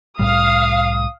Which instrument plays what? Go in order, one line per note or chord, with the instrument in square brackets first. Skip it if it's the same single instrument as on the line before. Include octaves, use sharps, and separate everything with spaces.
[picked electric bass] C2 A2 G3 [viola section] F5 [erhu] D#6